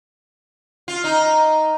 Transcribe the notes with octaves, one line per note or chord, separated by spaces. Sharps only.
F4
D#4